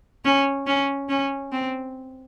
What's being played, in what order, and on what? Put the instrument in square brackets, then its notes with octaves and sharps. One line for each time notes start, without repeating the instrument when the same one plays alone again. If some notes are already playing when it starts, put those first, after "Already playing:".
[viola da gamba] C#4
C#4
C#4
C4